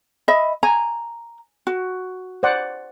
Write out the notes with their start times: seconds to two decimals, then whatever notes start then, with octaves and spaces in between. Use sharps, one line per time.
0.28 D#5 E5 B5
0.63 G#5 A#5
1.67 F#4
2.43 C5 D5 F#5